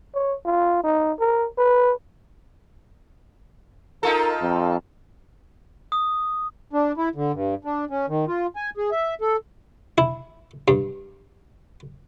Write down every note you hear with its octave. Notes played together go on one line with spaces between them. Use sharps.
C#5
F4
D#4
A#4
B4
D#4 F4 A4 A#4
F2
D#6
D4
E4
D3
G2
D4
C#4
D#3
F4
G#5
G#4
E5
A4
E4
G2